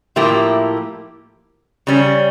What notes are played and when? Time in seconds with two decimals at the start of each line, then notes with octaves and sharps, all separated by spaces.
0.16 A2 F3 A#3 E4 G4
1.87 C#3 G3 C#4